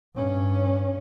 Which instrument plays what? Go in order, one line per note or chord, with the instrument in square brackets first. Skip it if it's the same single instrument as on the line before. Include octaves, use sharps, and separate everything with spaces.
[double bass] G2 C#4